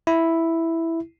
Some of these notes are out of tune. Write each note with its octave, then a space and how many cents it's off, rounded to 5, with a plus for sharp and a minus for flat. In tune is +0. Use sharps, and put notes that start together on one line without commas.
E4 +0